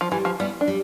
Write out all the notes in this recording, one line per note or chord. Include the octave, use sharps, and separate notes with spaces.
F3
E3 G3
F3
G3 B3 E4
D4
G3